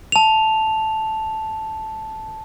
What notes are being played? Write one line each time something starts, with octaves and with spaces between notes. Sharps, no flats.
A5 F7